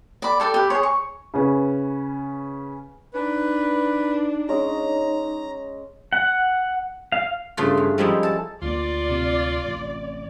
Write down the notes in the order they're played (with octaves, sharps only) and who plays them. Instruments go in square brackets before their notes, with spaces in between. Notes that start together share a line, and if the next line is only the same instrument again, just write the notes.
[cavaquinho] D5 B5
G4 A4 D5 D6
G4 B4
G#4 C#5
C#6
[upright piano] C#3 C#4 B4
[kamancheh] D4 [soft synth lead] D#4 [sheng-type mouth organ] B4
[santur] G#3 C#4 D#6 [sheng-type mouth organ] A#5
[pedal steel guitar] F#5
F5
[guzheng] G2 C#3 A3 F4
G2
F3 G3 G#3 C#4 D#4 E4
A4 A5
[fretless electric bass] D2 A#3 [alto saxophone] F4 [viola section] D5
[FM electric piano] C3
[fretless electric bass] A1